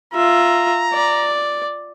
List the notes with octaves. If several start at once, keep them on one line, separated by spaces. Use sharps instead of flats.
F4 E5 A#5
D5